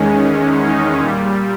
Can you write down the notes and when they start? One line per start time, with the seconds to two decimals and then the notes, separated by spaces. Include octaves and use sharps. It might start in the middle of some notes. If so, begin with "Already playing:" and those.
Already playing: E2 D#3 G#3 C#4
0.64 D#4
1.00 A#2 G3